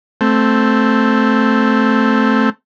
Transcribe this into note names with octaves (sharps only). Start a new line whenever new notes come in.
A3 C4